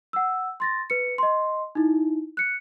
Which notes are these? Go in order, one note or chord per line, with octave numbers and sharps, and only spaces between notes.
F#5 E6
C6 A6 A#6
B4 C#7
D#5 C6
D#4 E4
F#6 C#7